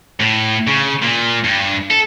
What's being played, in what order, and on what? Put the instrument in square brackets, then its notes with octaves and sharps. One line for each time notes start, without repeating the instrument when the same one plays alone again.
[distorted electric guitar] A2
C#3
A#2
G2
A4